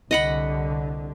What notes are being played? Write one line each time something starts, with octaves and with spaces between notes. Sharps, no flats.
C2 D3 D#5 F#5 B5